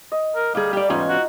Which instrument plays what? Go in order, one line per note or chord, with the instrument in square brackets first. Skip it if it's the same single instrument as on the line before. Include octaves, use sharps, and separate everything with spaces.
[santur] D#5
[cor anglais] A#4
[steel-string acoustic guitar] D2 G#4 [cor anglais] G3 [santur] F5 A#5
[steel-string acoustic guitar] G4 D5
[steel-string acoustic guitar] E2 G#2 C#4 [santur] D#4 F4 D#5
[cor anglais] F#4